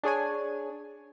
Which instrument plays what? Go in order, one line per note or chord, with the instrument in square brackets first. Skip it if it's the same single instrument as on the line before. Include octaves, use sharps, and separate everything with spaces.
[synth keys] D4 G#4 C#5 G#5